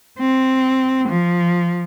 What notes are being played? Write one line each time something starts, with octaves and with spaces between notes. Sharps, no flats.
C4
F3